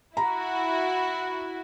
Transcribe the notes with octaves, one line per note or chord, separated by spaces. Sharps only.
E4 F#4 A#5 B5